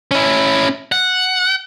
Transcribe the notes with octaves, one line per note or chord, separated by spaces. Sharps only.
C#4 E4
F#5